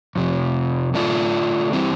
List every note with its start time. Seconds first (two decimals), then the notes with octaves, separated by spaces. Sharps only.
0.16 F2 C3 F3
0.94 D3 A3 D4 F4
1.73 E3 G3 C4 E4 G4